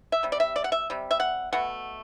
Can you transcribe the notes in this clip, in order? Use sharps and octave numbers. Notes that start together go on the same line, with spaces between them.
E5
C3 G3
D5
E5
D5
F#5
E5
C3 G3
E5
F#5
B2 A3 F#5